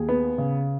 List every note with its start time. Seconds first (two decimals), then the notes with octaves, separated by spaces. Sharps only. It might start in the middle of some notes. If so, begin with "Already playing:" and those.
Already playing: D#2 G#4
0.09 B3
0.38 C#3